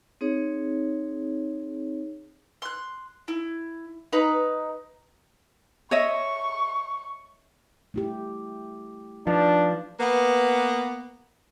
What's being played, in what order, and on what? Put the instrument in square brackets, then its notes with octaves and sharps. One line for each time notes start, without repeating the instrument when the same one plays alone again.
[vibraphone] C4 D#4 G#4 C#5
[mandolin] C6 F#6
E4
D#4 B4 A#5
[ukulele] C#5 D#5 E5 [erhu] C#6
[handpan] A3 E4 G4
[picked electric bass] F3 [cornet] D4 [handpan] D#4 B4 F5
[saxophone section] A#3 B3